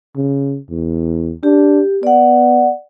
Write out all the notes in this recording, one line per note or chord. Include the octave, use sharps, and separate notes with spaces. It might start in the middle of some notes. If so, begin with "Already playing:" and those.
C#3
E2
D4 G4
B3 D5 F#5